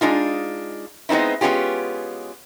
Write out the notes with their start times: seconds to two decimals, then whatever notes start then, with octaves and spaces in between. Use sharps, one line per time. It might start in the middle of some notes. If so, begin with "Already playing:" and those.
0.01 G#3 D4 D#4 F4
1.09 G#3 B3 C4 D#4 E4
1.41 G#3 B3 C#4 F4 G4